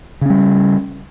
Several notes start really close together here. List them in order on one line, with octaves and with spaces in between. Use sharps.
C#3 C#4 G3